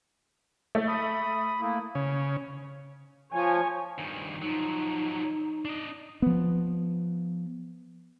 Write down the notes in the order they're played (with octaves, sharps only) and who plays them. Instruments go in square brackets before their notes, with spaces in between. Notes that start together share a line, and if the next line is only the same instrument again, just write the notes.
[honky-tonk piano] A3
[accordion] B5 D#6
A3 A#3 E4
[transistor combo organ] C#3
[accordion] F3 [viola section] C#5 G#5
[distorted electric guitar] G2 D#3
[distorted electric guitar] F3 F#3 [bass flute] D#4
[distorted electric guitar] D4 D#5
[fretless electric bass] F3 B3